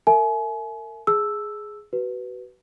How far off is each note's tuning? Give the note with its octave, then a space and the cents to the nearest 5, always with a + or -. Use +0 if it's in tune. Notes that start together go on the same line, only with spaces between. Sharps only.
A#4 -40 E5 +15 G#5 +40
G#4 +10 A5 +0 E6 +0
F#4 +35 B4 +0